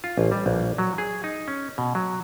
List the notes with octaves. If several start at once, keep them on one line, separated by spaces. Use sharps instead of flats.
F4
A1
G3
A#1
F#3
G#4
D#4
C#4
B2
F#3